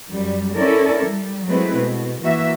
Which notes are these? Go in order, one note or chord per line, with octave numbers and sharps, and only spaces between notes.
F#2 G3
C#4 E4 A4 A#4 D5
G3
F#3 G#3 A3 C4 E4 B4
B2
E3 A#3 F#4 E5